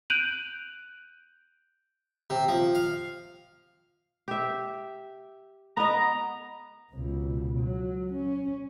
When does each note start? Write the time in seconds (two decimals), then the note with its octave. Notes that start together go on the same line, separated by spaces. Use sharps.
0.10 F#6 G6 D7 D#7 F7 F#7
2.30 C3
2.48 F3
2.75 F5
4.28 G4 E5
5.77 B3 D#5 A#5
6.93 C#2 B2
7.60 F#3
8.13 C#4